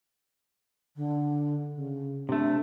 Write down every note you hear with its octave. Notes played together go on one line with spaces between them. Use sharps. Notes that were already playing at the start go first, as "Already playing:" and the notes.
D3
C#3
C3 A3 D4